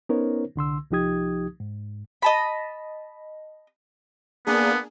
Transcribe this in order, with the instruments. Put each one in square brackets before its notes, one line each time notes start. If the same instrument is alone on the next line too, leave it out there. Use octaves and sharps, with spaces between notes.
[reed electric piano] B3 C#4 D#4 A#4 C5 C#5
C2 D3 C6 E6
C2 F3 D#4 G4 D#6 G#6
G#2
[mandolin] D#5 A5 B5
[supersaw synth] A#3 D4 G#4 [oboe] B3